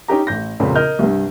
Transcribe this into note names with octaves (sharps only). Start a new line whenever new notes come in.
C#4 D#4 G4 A#5
A1 G6 A#6
F1 C#2 A#2 C#3 C4 B5
A#4 D#5 F6 G6
C2 G2